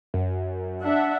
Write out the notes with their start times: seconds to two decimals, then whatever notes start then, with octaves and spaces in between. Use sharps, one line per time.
0.14 F#2
0.82 D4 E5 F#5